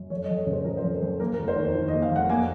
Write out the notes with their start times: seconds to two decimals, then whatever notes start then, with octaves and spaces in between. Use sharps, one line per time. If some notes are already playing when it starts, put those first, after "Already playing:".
Already playing: F#2
0.10 F2 C#5
0.24 D#5
0.29 F2
0.38 C#5
0.47 C#3 C5
0.65 F3 A#4
0.77 C5
0.84 F2
1.02 F2
1.20 A#3 A#4
1.34 A#4
1.39 F1
1.48 C5
1.56 D#2
1.75 D#3
1.88 D#5
1.93 A#3
2.02 F5
2.11 F1 F#5
2.29 A#3 G#5